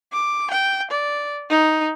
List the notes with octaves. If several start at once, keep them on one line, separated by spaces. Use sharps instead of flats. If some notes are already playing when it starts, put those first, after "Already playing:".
D6
G5
D5
D#4